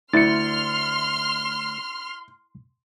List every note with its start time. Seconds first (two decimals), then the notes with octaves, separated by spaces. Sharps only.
0.13 D2 E4 C6 F6 A6 C#7